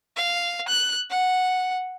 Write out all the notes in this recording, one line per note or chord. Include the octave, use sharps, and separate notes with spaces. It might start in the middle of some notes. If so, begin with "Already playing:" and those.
F5
F#6
F#5